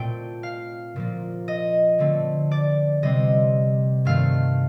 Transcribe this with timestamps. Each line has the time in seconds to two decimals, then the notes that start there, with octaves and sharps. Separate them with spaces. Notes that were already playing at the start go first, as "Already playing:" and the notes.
Already playing: A#2 A3 C4 G5
0.43 F5
0.96 A#2 F3 A#3
1.48 D#5
1.99 D3 A3 C4
2.51 D5
3.03 C3 G3 C4 D#5
4.05 G2 D#3 A3 C4 F5